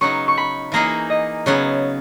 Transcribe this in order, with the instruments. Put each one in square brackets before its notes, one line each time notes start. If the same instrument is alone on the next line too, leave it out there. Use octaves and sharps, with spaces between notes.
[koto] C#3 F#3 B3 D#4 [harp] C#6
[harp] C#6
B5
[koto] E3 A#3 D#4 G#4 [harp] A#5
[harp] D#5
[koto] C#3 F#3 B3 [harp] C#5